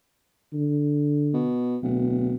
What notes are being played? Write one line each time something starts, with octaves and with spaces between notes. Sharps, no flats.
D3
B2
D1 B2